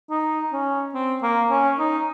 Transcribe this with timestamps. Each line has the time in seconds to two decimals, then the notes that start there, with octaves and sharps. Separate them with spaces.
0.11 D#4
0.53 C#4
0.94 C4
1.23 A#3
1.50 C#4
1.79 D#4